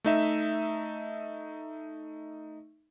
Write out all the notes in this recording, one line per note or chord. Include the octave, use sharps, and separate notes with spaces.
A3 D#4 E5